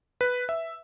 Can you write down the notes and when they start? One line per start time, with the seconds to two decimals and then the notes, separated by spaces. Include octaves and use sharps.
0.21 B4
0.49 E5